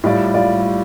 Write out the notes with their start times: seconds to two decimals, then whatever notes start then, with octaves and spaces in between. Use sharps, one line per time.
0.04 A2 G3 F4 D5
0.34 G3 F4 D5